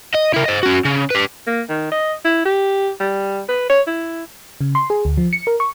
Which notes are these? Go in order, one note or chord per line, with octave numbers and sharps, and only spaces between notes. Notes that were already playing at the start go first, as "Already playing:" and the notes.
D#5
E4 A#4
C5 D#5
C#4 F#4
C#3
G4 B4
A#3
D#3
D#5
E4
G4
G3
B4
C#5
E4
C#3
C6
G#4
D2
F3
C#7
A#4
C#6